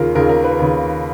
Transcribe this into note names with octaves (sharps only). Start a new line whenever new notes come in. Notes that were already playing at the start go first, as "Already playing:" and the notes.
Already playing: D#2 C#3 F4 A#4
D#2 C#3 A#4
A#4
B4
D#2 C#3